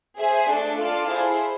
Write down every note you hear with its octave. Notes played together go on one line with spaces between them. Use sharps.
G#4 C5 E5 G#5
A3 D4 A4
F4 A4 D5 F5 A5
E4 G#4 C5